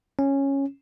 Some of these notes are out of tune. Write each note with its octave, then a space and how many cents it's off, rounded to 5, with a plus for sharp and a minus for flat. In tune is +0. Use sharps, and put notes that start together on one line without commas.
C#4 -10